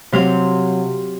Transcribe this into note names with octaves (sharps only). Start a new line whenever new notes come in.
C3 F#3 C4 F5